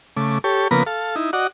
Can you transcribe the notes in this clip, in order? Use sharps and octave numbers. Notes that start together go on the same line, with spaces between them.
C#3 A3 D6
G4 A4 C#5
C#3 F3 A#3 B3 A#4 B4
A4 F5
D#4 E4
F#4 D5 D#5 F#5